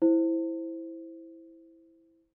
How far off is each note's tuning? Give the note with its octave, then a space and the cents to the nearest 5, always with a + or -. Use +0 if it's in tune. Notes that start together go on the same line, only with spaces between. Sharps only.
E4 +0 C5 +0